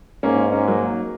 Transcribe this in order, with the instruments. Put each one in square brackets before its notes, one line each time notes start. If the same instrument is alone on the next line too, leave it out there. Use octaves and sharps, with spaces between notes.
[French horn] G#2 [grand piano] A#3 C#4
[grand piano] A#3 C#4
F#3 A#3